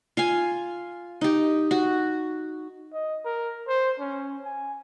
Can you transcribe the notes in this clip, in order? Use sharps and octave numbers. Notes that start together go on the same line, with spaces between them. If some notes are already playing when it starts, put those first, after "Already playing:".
F4 F5 G#5
D#4 G4
F#4
D#5
A#4
C5
C#4
G#5